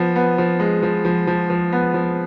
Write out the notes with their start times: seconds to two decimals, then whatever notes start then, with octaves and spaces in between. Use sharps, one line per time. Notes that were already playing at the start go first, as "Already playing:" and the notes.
Already playing: F3 B3
0.16 B3
0.38 F3
0.60 G#3
0.83 F3
1.05 F3
1.27 F3
1.50 F3
1.72 B3
1.94 F3